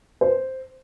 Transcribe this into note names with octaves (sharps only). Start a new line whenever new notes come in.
C5